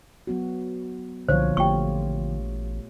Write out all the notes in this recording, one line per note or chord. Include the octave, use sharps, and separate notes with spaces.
F#3 B3 F#4
C2 A#2 D3 F3 C5 C#5 F5
A1 A3 F4 G4 G5 C#6